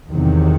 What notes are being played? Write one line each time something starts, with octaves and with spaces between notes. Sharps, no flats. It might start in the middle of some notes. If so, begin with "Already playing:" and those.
E2 C3 D#3 F#3